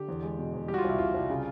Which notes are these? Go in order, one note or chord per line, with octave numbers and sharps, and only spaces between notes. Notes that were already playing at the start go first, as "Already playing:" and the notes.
Already playing: D3 G4
E2
G#3
B2
E2
G3 G4
F#4
F4
C2
E4
C2 F4
C2
C#3